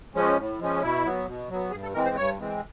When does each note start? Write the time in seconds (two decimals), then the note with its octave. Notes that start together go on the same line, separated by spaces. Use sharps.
0.15 F3 G#3 C#4
0.37 A2
0.59 F3 G#3 C#4
0.81 B2 E4
1.04 F#3 B3
1.27 B2
1.49 F#3 B3
1.71 G2 G#4
1.82 A4
1.94 E3 G#3 C4 A#4
2.05 C5
2.16 G2 C#5
2.39 E3 G#3 C4